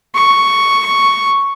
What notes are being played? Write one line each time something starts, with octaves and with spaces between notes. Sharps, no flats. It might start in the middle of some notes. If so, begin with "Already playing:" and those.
C#6